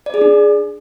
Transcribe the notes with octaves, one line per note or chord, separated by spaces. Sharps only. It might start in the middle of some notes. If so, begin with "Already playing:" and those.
D5
G#4
D4